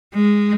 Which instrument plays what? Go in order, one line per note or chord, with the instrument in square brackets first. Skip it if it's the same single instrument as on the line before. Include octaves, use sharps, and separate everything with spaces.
[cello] G#3